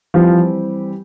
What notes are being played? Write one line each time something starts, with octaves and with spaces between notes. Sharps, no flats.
E3 F3 G3 C4 G4